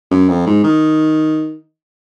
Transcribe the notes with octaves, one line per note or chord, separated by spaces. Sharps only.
F#2
F2
G#2
D#3